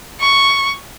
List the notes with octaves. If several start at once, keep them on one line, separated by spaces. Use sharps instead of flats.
C#6